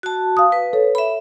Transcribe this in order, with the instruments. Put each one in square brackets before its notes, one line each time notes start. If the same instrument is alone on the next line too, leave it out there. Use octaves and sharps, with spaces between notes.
[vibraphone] F#4 A5
[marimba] F5 D#6
[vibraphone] B4
[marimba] A4 C#5
[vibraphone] E5 B5